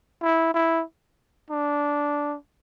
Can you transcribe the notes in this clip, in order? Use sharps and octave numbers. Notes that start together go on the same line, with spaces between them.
E4
E4
D4